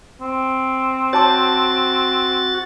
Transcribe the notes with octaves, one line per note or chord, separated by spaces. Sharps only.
C4
F#4 C#5 A5 D6 A6